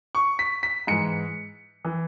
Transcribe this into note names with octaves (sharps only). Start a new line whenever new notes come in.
C#6
B6
B6
G#2 E3 C#7
E3